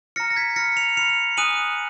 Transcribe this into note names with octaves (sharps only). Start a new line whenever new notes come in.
A#5 F6 A#6 C#7
A#6
G#6 B6
B5 F6 A#6 C#7
C#7 F7
B5 F6 C#7 F7
G#5 D#6 F#6 D#7 F#7